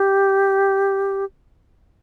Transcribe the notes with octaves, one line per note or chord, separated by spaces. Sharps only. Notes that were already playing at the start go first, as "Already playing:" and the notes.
Already playing: G4